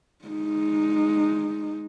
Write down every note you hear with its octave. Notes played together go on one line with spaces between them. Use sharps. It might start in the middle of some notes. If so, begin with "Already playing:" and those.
G#3 D#4